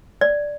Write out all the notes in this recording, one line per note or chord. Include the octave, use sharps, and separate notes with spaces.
D5